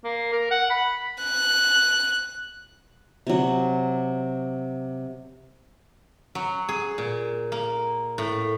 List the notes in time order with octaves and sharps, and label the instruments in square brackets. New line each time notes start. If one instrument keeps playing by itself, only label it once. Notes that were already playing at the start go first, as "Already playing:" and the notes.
[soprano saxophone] A#3
A#4
F#5
B5
[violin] F#6
[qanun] C3 F#3
[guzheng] F#3
G#4
A#2
A#3
A2